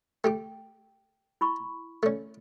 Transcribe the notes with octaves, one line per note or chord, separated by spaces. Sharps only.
A3 G4 G5 D6
E4 B5 C#6
A3 C#4